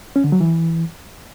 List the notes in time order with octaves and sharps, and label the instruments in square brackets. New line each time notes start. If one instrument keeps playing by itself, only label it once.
[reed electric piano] C#4
D3
F#3
E3